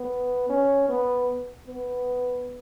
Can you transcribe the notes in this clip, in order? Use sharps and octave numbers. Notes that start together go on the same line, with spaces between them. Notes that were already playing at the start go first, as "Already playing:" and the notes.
Already playing: B3
C#4
B3
B3